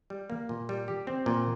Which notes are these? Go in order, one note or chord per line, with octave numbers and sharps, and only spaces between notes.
G3
A#3
A#2
G3
G4
C4
A#2